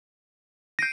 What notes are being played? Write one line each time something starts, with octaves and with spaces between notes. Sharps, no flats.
G6 A#6 C7 D7 D#7